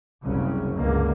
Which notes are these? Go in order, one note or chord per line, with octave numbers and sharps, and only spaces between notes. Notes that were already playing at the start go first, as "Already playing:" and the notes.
F#1 C2 C#3
C#2 G2 D3 A#3